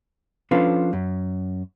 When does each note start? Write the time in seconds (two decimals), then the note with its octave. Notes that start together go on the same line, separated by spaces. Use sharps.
0.51 F3 C#4 D4 F4 A4 B4
0.93 F#2